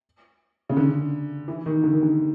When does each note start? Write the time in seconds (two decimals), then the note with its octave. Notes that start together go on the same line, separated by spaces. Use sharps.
0.69 C#3
0.77 D3
1.48 E3
1.66 D#3
1.83 D3
1.93 D#3
2.03 D3